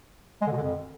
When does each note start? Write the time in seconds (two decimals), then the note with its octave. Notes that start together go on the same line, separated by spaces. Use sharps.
0.42 G#3
0.47 D3
0.52 B2
0.57 D3
0.62 F2